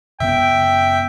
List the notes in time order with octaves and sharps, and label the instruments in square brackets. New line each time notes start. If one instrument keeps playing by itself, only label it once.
[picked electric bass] F#2 C#3 B3 [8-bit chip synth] E5 [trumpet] G5